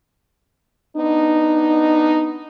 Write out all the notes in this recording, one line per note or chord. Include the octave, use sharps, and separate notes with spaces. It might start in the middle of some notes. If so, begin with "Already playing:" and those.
B3 D4 D#4